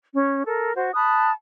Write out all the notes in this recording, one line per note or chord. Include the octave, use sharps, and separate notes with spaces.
C#4
A4 A#4
F#4 C5
A5 B5 D#6 F#6